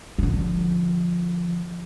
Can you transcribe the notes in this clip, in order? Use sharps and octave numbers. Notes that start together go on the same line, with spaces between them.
D3 F3